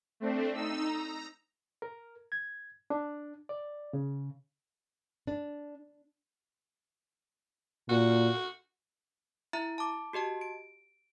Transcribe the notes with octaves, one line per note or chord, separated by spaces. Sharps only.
A3 C4 D4
D#4 E6
A#5
A#4
G#6
D4
D5
C#3
D4
A#2 F#4
E4 E5 A#5
A5 D6
F#4 G4 D#5 A5
D7